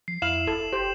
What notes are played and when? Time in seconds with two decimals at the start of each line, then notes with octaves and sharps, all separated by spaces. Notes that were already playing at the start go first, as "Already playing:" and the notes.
0.08 F3 C7
0.22 F2 E4 F5 E7 F#7
0.47 G1 A4
0.73 F#1 G4 C5